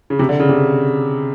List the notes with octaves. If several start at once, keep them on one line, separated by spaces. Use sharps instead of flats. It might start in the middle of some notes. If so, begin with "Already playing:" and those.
C#3
C3
D3
C#3
C3